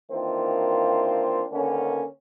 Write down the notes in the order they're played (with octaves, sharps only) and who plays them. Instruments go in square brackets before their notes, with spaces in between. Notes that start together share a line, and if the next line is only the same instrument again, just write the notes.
[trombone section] D#3 E3 A#3 C4 D4 F4
D3 D#3 A#3 B3 C#4